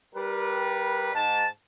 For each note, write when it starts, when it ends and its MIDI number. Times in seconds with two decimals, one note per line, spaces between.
0.15 1.11 55
0.15 1.11 70
0.15 1.11 71
1.14 1.46 44
1.14 1.46 81